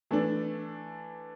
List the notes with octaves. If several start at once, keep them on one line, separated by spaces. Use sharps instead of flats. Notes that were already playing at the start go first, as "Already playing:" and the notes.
E3 A3 D4